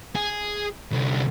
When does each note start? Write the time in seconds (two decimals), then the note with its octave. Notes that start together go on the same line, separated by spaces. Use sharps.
0.15 G#4
0.92 C2 D3